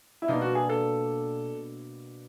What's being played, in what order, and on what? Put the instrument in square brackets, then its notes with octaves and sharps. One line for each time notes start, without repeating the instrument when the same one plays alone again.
[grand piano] E4
[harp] B2 G3 A#3 D4 [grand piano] D#4
[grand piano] F#4
G#4
A4